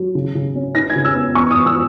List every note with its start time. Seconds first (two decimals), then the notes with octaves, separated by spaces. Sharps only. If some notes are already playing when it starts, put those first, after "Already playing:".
Already playing: F#3
0.15 C#3
0.35 C#3
0.55 C#4
0.75 D#4 A#6
0.90 G#6
0.96 C#3
1.05 E6
1.15 B3
1.35 E2 C#6
1.51 E2 D#6
1.66 E6